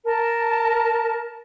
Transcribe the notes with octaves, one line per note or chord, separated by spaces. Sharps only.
A#4 A5